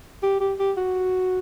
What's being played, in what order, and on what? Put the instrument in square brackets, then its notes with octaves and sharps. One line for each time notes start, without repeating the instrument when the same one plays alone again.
[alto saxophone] G4
G4
G4
F#4